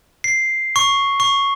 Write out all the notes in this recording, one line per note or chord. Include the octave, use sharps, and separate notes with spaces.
C7
C#6
C#6